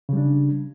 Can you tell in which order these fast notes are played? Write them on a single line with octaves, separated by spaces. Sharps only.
C#3 G3 D4